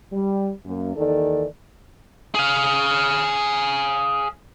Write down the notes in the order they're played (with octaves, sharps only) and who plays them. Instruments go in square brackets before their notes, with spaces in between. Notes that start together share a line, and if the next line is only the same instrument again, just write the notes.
[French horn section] G3
F#2 A#3
D#2 D#3 E3 A4 D5
[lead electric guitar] G#4 F5